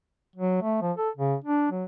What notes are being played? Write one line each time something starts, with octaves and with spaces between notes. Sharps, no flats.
F#3
A3
F3
A4
C#3
D4
F#3